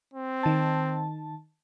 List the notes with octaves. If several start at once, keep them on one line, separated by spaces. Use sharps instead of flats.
C4
D#3 A5